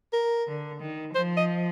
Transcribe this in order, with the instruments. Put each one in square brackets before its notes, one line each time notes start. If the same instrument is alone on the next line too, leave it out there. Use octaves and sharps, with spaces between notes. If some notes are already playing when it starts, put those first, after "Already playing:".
[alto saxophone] A#4
[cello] D3
D#3
[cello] F3 [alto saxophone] C5
[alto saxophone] D#5